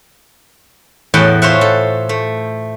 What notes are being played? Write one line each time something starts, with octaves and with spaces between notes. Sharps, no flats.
E2 A2 F#5 G5 A5
F4 C5 C#5 E5 F#5
A4
A3